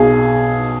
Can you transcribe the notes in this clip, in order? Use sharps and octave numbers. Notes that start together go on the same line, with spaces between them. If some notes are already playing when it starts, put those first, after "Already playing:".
Already playing: B1 B2 G#4